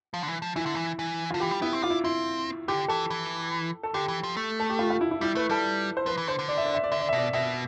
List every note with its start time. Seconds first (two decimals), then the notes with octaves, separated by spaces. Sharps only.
0.14 F3
0.23 D3
0.28 E3
0.42 F3
0.56 E3 E4
0.66 D3
0.75 E3
0.99 E3
1.30 D3 F4
1.40 E3 G4
1.51 G3
1.62 B3 E4
1.73 C4
1.82 D4 F4
1.90 E4
2.04 C4 E4
2.68 D3 G4
2.88 E3 A4
3.10 E3
3.83 A4
3.94 D3 G4
4.08 E3
4.23 F3
4.37 A3
4.60 A4
4.70 G4
4.79 F4
4.90 F4
5.01 E4
5.11 E4
5.21 G3 E4
5.35 A3 B4
5.50 G3 A4
5.97 C5
6.06 F3 B4
6.17 E3
6.27 D3 C5
6.39 D3
6.49 D5
6.57 E5
6.66 D5
6.75 E5
6.84 D5
6.92 D3 E5
7.00 D5
7.09 E5
7.13 B2
7.18 D5
7.33 B2 E5